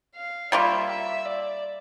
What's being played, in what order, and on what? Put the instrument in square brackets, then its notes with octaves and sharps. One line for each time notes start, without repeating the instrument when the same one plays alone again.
[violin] F5
[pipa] G3 A#3 F4 [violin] E5
[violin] E5
D5